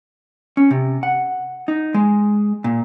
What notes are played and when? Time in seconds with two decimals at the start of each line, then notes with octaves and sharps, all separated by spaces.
0.57 C#4
0.71 C3
1.03 F#5
1.68 D#4
1.94 G#3
2.64 A#2